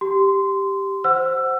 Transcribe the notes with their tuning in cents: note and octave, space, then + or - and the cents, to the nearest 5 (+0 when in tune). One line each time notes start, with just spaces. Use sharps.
G4 +0 C6 -15
C5 +0 F#5 +0 E6 +25